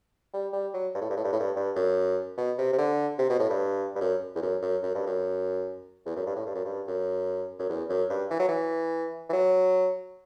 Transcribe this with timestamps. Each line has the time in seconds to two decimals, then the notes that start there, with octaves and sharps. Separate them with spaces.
0.34 G3
0.53 G3
0.74 F#3
0.95 G2
1.01 A2
1.10 G2
1.17 A2
1.25 G2
1.33 A2
1.40 G2
1.56 G2
1.76 F#2
2.37 B2
2.58 C3
2.73 C3
2.78 D3
3.19 C3
3.30 B2
3.39 A2
3.50 G2
3.96 G2
4.01 F#2
4.35 E2
4.42 F#2
4.62 F#2
4.83 F#2
4.95 G2
5.06 F#2
6.06 E2
6.16 F#2
6.26 G2
6.36 A2
6.46 G2
6.55 F#2
6.65 G2
6.87 F#2
7.59 F#2
7.69 E2
7.89 F#2
8.10 G2
8.31 E3
8.39 F#3
8.48 E3
9.29 E3
9.33 F#3